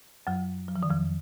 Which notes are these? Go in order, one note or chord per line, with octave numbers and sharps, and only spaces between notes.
F#2 F#3
F#3
F3
D#3
F2 F3